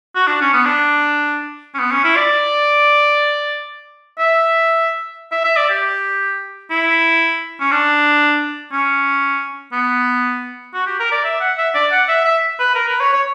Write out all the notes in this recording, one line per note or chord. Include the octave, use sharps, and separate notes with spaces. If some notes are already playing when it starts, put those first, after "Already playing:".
F#4
D4
C#4
B3
D4
C#4
B3
C#4
E4
D5
E5
E5
E5
D5
G4
E4
C#4
D4
C#4
B3
F#4
G4
A#4
D5
E5
F#5
E5
D5
F#5
E5
E5
B4
A#4
B4
C#5
C#5